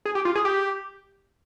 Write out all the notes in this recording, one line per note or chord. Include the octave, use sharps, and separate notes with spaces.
G#4
G4
F4
G#4
G4